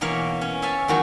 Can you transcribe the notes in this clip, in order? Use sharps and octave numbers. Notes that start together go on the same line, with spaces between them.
B2 E3 A#3 A#4 C#5 F5
C#4
C#5 E5 F5 G#5 A5
E2 D#3 F#3 F#4 A#5